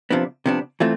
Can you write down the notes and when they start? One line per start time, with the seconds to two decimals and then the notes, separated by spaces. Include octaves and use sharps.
0.10 C3 F3 B3 D4
0.46 C3 F3 B3 D4
0.80 E3 A3 C4 F4